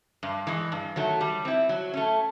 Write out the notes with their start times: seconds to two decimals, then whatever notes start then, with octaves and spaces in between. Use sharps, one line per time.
0.23 G2
0.47 E3 G#3
0.72 G2
0.96 D#3 F#3 A3
1.21 G3
1.45 C4 E4
1.69 F#3
1.94 A3 C#4